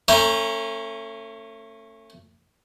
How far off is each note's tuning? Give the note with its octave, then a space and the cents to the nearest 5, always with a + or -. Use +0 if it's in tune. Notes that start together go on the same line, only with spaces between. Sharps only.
A3 +30 C#4 -25 A#5 +0